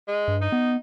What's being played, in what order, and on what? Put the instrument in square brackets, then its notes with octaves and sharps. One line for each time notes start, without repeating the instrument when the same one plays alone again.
[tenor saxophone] G#3
[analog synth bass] G2
[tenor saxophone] D#4
[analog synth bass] B3